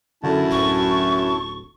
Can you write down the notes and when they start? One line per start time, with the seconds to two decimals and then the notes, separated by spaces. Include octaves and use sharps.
0.24 F#2 D3 E4 A5
0.51 D1 C#6